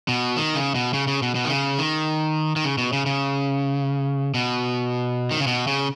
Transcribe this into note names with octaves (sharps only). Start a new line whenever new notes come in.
B2
D#3
C#3
B2
C#3
C#3
B2
B2
D#3
C#3
D#3
D#3
C#3
B2
C#3
C#3
B2
D#3
C#3
B2
C#3